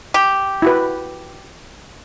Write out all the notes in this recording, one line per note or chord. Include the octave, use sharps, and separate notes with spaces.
G4
E4 F#4 B4